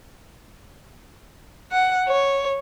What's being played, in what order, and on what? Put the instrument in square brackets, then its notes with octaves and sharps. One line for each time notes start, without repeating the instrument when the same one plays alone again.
[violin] F#5
C#5